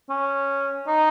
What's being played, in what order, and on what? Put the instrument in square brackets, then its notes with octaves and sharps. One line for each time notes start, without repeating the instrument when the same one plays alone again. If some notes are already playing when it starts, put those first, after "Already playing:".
[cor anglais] C#4
D#4